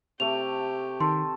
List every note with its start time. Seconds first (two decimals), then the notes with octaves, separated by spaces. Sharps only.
0.20 C3 A3 G4 F7
1.00 D#3 A4 C6